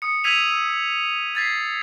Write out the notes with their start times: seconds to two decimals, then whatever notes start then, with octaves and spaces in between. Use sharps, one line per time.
0.02 D#6 C#7
0.24 E6 G#6 B6 D#7 F7
0.51 E6
1.35 G#6 A6 B6 C7